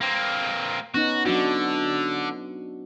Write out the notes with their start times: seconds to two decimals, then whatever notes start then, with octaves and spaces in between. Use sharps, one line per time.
0.01 A#3 C4
0.94 B3 C#4 D#4 F#4
1.26 D3 F#3 D4 F#4